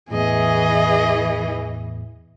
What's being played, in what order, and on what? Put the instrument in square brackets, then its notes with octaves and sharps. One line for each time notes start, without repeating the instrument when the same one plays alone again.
[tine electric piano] E2 A2 [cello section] E3 [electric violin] G#4 D#5